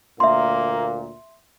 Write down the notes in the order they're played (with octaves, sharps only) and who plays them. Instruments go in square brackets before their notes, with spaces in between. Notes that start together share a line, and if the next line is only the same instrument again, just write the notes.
[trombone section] D2 A#2 A#3 [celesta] E5 C6